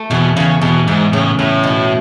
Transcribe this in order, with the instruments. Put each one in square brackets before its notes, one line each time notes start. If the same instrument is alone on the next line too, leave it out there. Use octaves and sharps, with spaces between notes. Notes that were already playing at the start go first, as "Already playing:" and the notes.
Already playing: [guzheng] A3
[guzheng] E2 [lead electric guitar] B2
[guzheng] E2 [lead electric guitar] C#3
[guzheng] E2 [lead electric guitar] B2
[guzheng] E2 [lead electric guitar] G#2
[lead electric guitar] A2 [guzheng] C#3
[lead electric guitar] A2 [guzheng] A3
[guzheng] B2